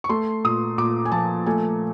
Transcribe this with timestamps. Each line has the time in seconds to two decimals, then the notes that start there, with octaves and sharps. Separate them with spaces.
0.04 C#6
0.09 A3 C6
0.44 A#2 D#6
0.78 A#2 D6
1.05 G#5
1.12 F3 A5
1.46 A3 G#5